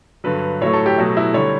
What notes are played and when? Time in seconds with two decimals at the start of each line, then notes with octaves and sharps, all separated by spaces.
0.24 G2 D3 F#3 B4
0.61 A2 F#3 A3 C#5
0.73 A4
0.86 G4
0.98 B2 F#3 A3
1.17 E4
1.34 D3 G3 C#5